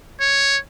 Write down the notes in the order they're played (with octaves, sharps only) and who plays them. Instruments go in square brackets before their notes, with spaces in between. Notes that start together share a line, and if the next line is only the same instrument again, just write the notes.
[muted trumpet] C#5